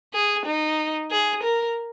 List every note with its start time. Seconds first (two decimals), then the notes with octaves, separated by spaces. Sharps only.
0.14 G#4
0.45 D#4
1.11 G#4
1.43 A#4